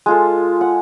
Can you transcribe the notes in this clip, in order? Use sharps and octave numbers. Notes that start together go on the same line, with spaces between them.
G#3 F4 A4
F#5